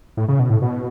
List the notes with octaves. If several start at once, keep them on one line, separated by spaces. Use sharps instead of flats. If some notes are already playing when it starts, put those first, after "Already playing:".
A2
C#3
B2
A2
B2